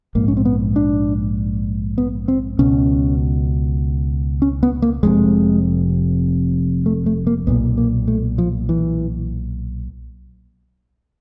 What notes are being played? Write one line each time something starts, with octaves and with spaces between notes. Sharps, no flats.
A#1 G#2 A#3
C#4
C4
B3
D4
B3
C4
C#2 B2 C#4
C#4
B3
A#3
F1 F2 C3 G#3
A3
A3
A#3
B1 A#2 B3
A#3
A3
F3
E3